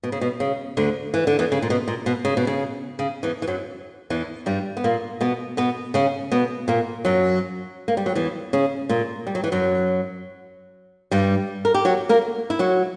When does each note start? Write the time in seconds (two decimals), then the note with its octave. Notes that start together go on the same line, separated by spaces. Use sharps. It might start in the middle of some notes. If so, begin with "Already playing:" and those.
0.04 B2
0.12 C#3
0.21 B2
0.40 C#3
0.77 D2 D3
1.14 E3
1.27 D3
1.39 E2 E3
1.52 C#3
1.62 A#2
1.70 B2
1.88 A#2
2.06 B2
2.25 C#3
2.37 B2
2.47 C#3
2.99 C#3
3.23 E2 E3
3.42 E3
3.47 F#2 F#3
4.10 E2 E3
4.46 G2 G3
4.77 B3
4.84 A#2 A#3
5.21 B2 B3
5.57 B2 B3
5.94 C#3 C#4
6.32 B2 B3
6.68 A#2 A#3
7.05 F#2 F#3
7.88 A#3
7.97 G3
8.06 F#3
8.15 E2 E3
8.53 C#3 C#4
8.89 A#2 A#3
9.27 G3
9.35 F#3
9.44 E3
9.52 F#2 F#3
11.11 G2 G3
11.65 A#4
11.74 G4
11.85 F#3 F#4
12.09 A#3 A#4
12.50 E4
12.59 F#3 F#4